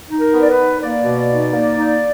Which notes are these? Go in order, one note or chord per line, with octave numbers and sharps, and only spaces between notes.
D#4
A#4
B3
D5
B4
D#4
A#3 D5
B2
D#4
A#3
D#4